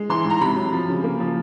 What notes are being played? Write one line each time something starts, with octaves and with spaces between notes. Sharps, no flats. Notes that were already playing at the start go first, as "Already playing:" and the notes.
Already playing: G#3
E3 C6
G#2
A#5
C3 B5
F#3
F3
C#3
A#3
F3